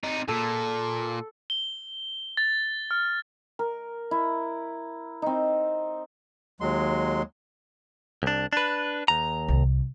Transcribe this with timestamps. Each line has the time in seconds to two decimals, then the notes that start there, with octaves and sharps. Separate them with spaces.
0.03 C3 D#4
0.28 A#2 A4
1.50 G7
2.37 A6
2.91 F6
3.59 A#4
4.11 E4
5.22 C4 D#4
6.61 D#2 F#3 G#3 C6
8.23 C2 D4
8.53 D4 B4
9.08 D#2 A#5
9.48 C2